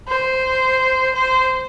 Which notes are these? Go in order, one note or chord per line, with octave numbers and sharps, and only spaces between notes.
C5
C5